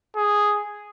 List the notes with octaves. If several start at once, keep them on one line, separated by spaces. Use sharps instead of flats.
G#4